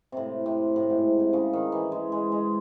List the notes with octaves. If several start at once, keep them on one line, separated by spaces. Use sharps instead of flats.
A2 C3
C3
A2
G#2
C3
C#3
D#3
E3
G#3
G#3
G#3